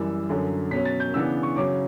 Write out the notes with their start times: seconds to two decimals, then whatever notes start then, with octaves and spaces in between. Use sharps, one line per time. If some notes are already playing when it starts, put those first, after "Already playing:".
Already playing: F#2 E3 G3 E6
0.29 F#2 D3 F#3 C#4
0.71 B2 F#3 C#4 B6
0.85 A6
1.00 G6
1.13 C#3 E3 B3 D4 E6
1.43 C#6
1.56 C#3 F#3 C#4 D6